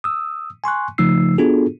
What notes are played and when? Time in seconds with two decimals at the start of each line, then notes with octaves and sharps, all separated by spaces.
0.04 D#6 E6
0.64 G#5 C6 C#6 F#6
0.98 C#3 F3 A3 D#4 E6 C7
1.38 B3 D4 F4 F#4 G#4 A4